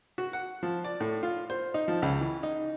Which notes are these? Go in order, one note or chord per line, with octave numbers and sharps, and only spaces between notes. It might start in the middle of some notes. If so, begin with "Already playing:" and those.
F#4
F#5
F3
D5
A2
F4
C5
D#4
F3
C#2
E3
D#4